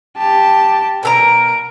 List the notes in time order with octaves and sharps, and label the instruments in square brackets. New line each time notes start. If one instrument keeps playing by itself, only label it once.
[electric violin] G4 A5
[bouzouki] B2 A4 A#5 [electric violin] A#4 D7